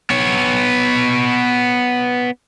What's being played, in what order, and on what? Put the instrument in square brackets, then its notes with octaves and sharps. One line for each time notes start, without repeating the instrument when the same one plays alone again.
[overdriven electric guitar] B3 C#5